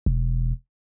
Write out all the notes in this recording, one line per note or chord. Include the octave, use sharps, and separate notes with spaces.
E1